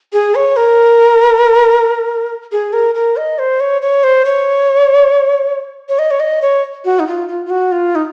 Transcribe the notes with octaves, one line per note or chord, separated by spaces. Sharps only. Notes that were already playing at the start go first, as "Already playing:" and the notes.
G#4
C#5
A#4
G#4
A#4
A#4
D#5
C5
C#5
C#5
C5
C#5
C#5
D#5
C#5
D#5
C#5
F#4
D#4
F4
F4
F4
F#4
F4
D#4